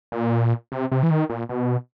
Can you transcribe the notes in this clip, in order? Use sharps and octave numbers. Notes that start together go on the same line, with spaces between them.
A#2
C3
C3
E3
D#3
A#2
B2